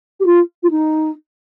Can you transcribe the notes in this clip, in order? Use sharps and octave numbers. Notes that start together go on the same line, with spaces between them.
G4
F4
F4
D#4